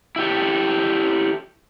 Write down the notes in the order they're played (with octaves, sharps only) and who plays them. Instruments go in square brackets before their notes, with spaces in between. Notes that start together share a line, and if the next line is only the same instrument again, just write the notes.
[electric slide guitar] E4 G4 A4